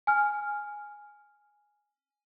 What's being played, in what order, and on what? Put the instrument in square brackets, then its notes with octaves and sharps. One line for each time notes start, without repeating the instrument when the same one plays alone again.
[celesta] G#5 F6